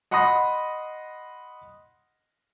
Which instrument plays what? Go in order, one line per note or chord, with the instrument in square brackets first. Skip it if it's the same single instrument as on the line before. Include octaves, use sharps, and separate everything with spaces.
[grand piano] D#5 F#5 B5 C6 D#6 A#6